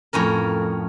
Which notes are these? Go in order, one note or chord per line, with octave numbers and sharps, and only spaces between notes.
F2 A2 C#4 A#4